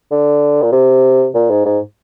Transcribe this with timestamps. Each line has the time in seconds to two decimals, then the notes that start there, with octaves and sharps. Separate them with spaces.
0.11 D3
0.62 A#2
0.72 C3
1.35 A#2
1.50 G#2
1.65 G#2